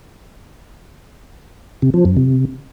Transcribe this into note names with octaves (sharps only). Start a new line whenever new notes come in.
C3
F3
F#2
C3